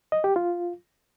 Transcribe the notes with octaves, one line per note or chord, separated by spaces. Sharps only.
D#5
G4
F4